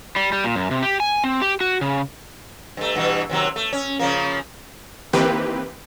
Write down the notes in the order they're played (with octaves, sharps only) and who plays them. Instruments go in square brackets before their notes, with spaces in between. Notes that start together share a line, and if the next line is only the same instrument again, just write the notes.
[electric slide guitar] G3
G3
A#2
F#2
C3
G4
G#5
C4
G4
F#4
C#3
[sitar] G2 A3
G2 B2 E3
D#2 C3 F#3
A3
C#4
C#3 F3 A#3
[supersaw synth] D#3 E3 A#3 C4 G4 B4